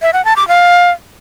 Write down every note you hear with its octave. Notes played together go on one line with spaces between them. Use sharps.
E5
F#5
A5
D6
F5